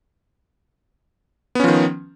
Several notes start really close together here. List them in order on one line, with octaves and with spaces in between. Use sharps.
B3 C#4 F3 D#3